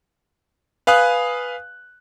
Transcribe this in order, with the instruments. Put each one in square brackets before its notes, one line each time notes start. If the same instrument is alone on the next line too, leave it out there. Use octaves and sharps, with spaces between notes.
[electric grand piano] B4 F5 G#5 D#6 F#6